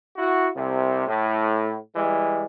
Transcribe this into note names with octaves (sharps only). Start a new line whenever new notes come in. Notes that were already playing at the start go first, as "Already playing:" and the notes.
E4 F#4
C2 C3
A2
E3 G3 G#3